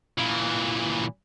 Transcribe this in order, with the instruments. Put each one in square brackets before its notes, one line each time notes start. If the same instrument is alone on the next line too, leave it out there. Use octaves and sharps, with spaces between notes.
[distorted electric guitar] A#2 E3